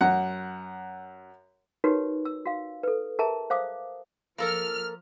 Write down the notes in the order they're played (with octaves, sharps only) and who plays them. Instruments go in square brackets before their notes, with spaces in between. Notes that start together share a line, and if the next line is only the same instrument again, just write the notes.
[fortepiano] F#2 F#5
[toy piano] D#4 F#4 G4 A#4 B4 C#5
E6
F#4 F5
A4 B4
G#4 A#4 E5 A5 A#5
C5 F5 D6 D#6
[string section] F3 F6 [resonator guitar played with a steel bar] A#3 A4 A#4